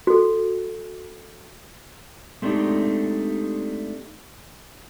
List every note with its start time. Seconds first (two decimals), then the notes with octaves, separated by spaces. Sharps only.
0.07 F#4 A4
2.42 G#3 A3 C4 D4 D#4 G4